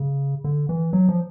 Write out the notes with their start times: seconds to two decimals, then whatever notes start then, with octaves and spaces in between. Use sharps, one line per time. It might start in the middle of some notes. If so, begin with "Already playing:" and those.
Already playing: C#3
0.44 D3
0.69 E3
0.93 F#3
1.09 F3